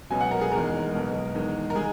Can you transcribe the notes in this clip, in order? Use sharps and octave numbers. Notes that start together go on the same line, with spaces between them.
C#2 B2 F#3 G#5
F#5
A#4
G#4
F#1 E2 D#3 G#3 A#4
B1 B2 G#3
E2 D#3 G#3
A#4
D#3 G#3 G#4